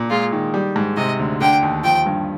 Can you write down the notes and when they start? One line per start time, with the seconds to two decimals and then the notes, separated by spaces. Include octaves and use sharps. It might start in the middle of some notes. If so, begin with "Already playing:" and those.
Already playing: A#2
0.10 G#3 F4
0.32 D#3
0.54 G3
0.76 G#2
0.97 C3 D#5
1.19 D2
1.41 D3 G5
1.62 D#2
1.84 F3 G5
2.06 G2